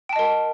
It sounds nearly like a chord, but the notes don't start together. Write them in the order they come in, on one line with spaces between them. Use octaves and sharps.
G5 A5 D#5 A#4